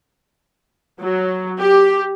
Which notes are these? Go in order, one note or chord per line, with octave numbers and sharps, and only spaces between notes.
F#3
G4